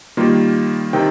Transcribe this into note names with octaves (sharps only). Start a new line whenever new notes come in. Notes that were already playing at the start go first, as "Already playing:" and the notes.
D#3 G3 A#3 F4
C3 D#3 C4 D#4 G5